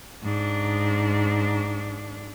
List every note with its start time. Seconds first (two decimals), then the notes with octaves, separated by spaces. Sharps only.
0.24 G#2 D4